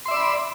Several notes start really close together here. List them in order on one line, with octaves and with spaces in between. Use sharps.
C6 E5 D5 E6 B5